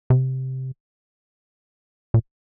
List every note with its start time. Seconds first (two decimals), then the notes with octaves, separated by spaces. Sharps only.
0.10 C3
2.14 A#2